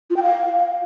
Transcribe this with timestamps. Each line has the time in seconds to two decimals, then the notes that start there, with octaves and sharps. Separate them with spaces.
0.10 F4
0.16 G5
0.23 F5